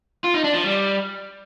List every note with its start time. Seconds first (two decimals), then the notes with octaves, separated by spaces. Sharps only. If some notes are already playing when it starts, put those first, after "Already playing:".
0.24 F4
0.34 D#4
0.44 D4
0.54 F3
0.64 G3